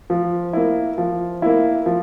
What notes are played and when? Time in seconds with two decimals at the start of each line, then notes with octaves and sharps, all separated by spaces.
0.10 F3
0.53 A#3 E4
0.98 F3
1.42 A#3 E4
1.86 F3